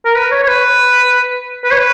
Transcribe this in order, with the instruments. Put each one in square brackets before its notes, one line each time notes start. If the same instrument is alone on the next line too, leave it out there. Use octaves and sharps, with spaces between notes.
[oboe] A#4
B4
C#5
C#5
B4
B4
C#5
B4